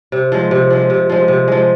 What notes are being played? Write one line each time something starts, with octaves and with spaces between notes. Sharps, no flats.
C3
F3 G#3
C3
F3 G#3
C3
F3 G#3
C3
F3 G#3